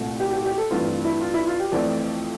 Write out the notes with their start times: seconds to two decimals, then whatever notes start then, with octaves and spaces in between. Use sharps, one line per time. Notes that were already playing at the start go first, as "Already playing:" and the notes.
Already playing: C2 A#2 A3 C4
0.20 G4
0.33 G4
0.46 G4
0.58 A4
0.71 G2 E3 A3 C4 F4
0.88 F4
1.05 E4
1.21 F4
1.34 E4
1.47 F4
1.60 G4
1.72 F2 E3 A3 C4 D5